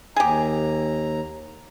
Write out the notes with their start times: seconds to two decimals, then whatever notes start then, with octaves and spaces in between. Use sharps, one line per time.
0.16 D#2 G4 G#4 A#5